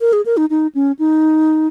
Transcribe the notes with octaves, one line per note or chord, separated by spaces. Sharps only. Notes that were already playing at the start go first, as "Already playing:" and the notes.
A#4
G#4
A#4
D#4
D#4
C#4
D#4